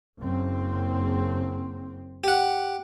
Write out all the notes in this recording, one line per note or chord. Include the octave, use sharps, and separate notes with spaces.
F#1 C4
G4 F#5